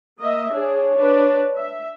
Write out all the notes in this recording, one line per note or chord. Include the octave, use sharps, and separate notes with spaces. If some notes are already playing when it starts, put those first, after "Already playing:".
A#3 D#5 E5
D4 G#4 C#5
D4 B4
E5